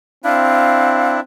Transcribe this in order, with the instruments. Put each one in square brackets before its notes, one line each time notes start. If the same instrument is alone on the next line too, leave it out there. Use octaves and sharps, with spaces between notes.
[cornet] C4 [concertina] D4 E4 [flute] F5